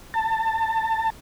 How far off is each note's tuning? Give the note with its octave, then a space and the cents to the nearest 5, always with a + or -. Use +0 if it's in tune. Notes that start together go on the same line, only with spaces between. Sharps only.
A5 +25